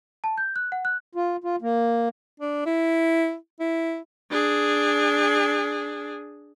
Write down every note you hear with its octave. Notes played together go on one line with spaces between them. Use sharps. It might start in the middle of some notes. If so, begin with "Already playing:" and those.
A5
G6
F#6
F#5
F#6
F4
F4
A#3
D4
E4
E4
D4 G#4